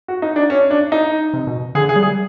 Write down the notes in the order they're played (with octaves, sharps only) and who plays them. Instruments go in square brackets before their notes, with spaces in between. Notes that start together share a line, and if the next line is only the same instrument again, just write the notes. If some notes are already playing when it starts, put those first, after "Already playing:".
[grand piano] F#4
D#4
D4
C#4
D4
D#4
[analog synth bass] C3
B2
[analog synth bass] D3 [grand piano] G#4
[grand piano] G#4
[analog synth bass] G3
[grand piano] G#4